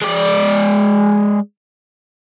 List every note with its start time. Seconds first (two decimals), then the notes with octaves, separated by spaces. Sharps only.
0.02 G#3 D5